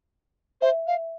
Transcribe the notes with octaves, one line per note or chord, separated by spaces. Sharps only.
C5 E5
F5